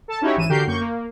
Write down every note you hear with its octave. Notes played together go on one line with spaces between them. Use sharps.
A4 A5
C#4 D#4 E4 F#4 G4 C#5
G#1 E3 D#7 E7
D3 F#4 G4 A#4 G6 C7
F#2 A#3 C#6 G6
A#3